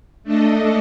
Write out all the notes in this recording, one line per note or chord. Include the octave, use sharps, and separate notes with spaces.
A3 D4 A4 D#5